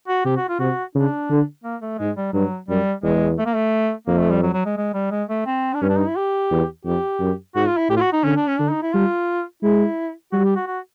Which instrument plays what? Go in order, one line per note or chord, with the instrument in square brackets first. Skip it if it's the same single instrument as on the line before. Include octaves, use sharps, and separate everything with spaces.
[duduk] F#4
[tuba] C3 [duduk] G4
[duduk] F#4
F4
[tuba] C3 [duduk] F#4
[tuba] C#3 [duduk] D4
[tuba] D3
[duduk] A#3
A3
[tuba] G#2 [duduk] G#3
[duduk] G3
[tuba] G2 [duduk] F#3
[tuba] F#2 [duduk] G3
[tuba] E2 [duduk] G#3
[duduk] A3
A#3
A3
[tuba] F2 [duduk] A#3
[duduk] A3
G3
F#3
F#3
G#3
G#3
G3
G#3
A3
C4
D4
[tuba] G2 [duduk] C#4
[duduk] D4
D#4
E4
G4
[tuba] E2
[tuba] F2 [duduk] G4
[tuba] F#2
[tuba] G#2 [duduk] F#4
[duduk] F4
E4
[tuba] A2 [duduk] G4
[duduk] F4
F#4
D#4
[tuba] D3 [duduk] C#4
[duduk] D4
C#4
[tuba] D3 [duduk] D4
[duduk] D#4
E4
[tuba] G3 [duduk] F4
[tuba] G#3 [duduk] E4
[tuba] G3 [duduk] F#4
[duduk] G4
F#4
F#4